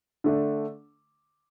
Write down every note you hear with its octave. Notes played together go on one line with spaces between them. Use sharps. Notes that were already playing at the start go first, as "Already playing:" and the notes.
D3 A3 D4